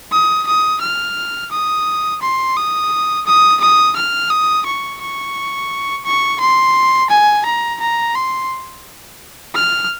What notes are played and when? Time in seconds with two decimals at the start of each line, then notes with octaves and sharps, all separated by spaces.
0.12 D#6
0.47 D#6
0.81 F6
1.52 D#6
2.22 C6
2.57 D#6
3.26 D#6
3.61 D#6
3.96 F6
4.31 D#6
4.66 C#6
5.01 C#6
6.06 C#6
6.41 C6
7.10 G#5
7.46 A#5
7.81 A#5
8.15 C6
9.55 F6